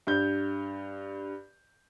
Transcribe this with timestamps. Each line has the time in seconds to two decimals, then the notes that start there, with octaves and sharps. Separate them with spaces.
0.07 G2 G6